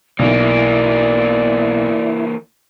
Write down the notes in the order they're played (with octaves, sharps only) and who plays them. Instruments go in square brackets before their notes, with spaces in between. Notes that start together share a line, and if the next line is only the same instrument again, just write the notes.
[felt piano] B1 [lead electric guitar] E3 A#3 [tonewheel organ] E4 [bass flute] D5